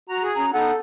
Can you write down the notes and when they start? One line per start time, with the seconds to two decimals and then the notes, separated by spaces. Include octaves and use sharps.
0.09 F#4 A#5
0.23 G#4
0.36 C#4 A#5
0.53 B3 D#4 A4 F#5